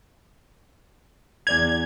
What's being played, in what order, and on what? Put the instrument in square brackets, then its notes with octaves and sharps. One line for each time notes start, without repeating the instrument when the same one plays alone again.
[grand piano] E2 D5 F7 [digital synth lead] G#6